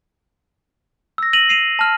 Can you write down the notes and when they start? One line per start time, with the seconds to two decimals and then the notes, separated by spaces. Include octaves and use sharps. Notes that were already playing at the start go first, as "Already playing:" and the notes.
1.18 E6 A#6
1.33 A#6 D#7 F7 F#7
1.49 C7 D#7 F7
1.79 A5 F6